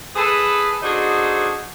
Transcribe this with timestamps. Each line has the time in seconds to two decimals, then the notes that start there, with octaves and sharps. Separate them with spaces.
0.16 G#4 A4 B4
0.82 D4 D#4 F#4 G#4 A4 C5